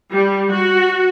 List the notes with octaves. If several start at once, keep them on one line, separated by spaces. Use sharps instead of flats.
G3
F#4